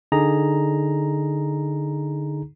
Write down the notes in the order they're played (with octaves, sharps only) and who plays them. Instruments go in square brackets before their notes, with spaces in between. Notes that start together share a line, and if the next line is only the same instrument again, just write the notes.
[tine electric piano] D3 D#4 G#4 A#5